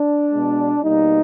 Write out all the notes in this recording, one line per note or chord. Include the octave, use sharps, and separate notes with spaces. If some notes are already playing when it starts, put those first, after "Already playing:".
Already playing: D4
B2 G#3 B3
B2 G3 A#3 D#4